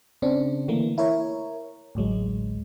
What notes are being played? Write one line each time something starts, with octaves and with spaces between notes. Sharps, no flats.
C#3 C4 D4
D3 E3 A3 A#3
E4 A#4 C#5
A1 D2 F#3 G#3